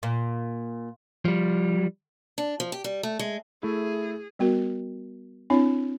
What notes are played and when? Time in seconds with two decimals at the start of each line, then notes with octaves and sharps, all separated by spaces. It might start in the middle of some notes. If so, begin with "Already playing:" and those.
0.03 A#2
1.25 F3 G3
2.38 D4
2.60 F3
2.72 G4
2.84 G3
3.03 A3
3.19 G#3
3.63 A3 E4 G#4
4.39 G3 B3 F#4 A#4
5.50 C4 D4 E4 C#5